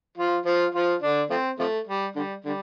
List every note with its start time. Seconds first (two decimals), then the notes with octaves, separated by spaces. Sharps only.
0.17 F3 F4
0.45 F3 F4
0.74 F3 F4
1.02 D3 D4
1.30 F3 A3 C4
1.59 C3 F3 A3
1.87 G3
2.15 D3 G3
2.45 D3 G3